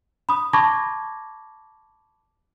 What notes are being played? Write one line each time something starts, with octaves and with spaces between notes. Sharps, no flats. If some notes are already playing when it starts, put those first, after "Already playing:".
B5 D#6
A5 B5 C#6 D6 G#6 A#6